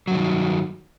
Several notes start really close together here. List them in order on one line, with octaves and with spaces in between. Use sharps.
F#3 G2 D#3